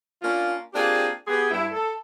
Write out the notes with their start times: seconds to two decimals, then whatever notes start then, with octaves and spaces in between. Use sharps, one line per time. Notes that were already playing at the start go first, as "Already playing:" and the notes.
0.22 A#3 C#4 D4 F4
0.73 A#3 C4 D4 F4 G4 G#4
1.28 B3 G4 G#4
1.51 G2 E4
1.72 A4